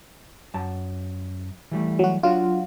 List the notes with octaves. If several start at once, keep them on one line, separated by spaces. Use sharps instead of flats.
F#2 A5
E3 G3 A3
F#3 F#4
F#3 D4 F4 F#4